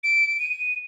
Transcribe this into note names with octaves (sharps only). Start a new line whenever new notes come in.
D7
D#7